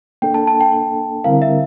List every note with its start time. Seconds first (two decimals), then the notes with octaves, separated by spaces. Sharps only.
0.22 A#3 D4 A4 G5
0.34 A5
0.47 A5
0.61 G5
1.24 D3 G3 C4 E4 A#4 F5
1.42 E5